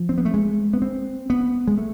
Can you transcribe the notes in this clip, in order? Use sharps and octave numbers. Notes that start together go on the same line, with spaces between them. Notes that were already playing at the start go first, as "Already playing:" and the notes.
Already playing: F3
C4
B3
A3
G#3
B3
C4
B3
G#3
A3